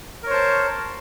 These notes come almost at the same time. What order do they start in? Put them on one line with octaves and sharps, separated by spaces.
A#4 C#5 C5 A5